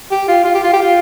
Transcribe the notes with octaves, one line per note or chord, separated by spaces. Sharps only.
G4
F4
F4
G4
F4
G4
F4